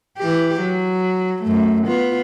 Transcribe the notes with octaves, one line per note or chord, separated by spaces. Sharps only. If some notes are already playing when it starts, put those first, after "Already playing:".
E3 G4
F#3
F#2 A3
B3 F4